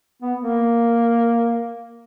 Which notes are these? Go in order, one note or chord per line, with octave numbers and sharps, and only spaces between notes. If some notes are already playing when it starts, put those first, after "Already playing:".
B3
A#3